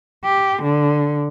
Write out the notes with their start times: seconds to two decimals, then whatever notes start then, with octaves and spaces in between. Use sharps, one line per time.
0.25 G4
0.63 D3